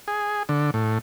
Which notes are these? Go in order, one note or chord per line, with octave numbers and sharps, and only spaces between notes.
G#4
D3
A2